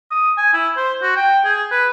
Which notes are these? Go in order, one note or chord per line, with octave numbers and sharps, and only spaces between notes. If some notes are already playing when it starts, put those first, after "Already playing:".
D#6
G#5
E4
C5
F#4
G5
G#4
B4